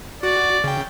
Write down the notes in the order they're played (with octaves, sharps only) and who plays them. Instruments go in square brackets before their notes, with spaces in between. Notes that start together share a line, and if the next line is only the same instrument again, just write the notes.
[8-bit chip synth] F#4 [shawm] D5
[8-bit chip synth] C#3 G5